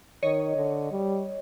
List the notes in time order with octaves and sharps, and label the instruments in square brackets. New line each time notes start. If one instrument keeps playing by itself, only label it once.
[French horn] D#3 [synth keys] C#5 D#5
[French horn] D3
G3